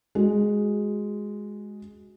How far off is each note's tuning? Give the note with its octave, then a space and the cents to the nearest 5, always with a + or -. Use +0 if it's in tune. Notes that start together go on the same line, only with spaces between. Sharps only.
G#3 +0 F#4 +0